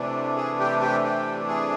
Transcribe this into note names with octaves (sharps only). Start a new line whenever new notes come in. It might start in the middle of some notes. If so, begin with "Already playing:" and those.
Already playing: C3 E3 A3 D4
G#4
G4
G4
G4
G#4